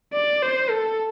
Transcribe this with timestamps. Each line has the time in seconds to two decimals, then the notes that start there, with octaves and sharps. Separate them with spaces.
0.13 D5
0.42 C5
0.71 A4